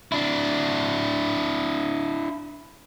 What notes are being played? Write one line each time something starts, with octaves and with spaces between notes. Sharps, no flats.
D4 E4